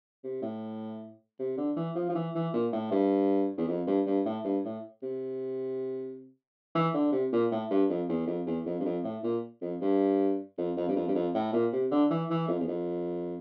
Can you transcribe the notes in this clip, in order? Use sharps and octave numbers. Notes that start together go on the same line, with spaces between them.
C3
A2
C3
D3
E3
F3
F3
E3
E3
A#2
A2
G2
E2
F2
G2
G2
A2
G2
A2
C3
E3
D3
C3
A#2
A2
G2
F2
E2
F2
E2
F2
G2
F2
A2
A#2
F2
G2
F2
F2
G2
F2
G2
F2
A2
A#2
C3
D3
E3
E3
F2
E2
F2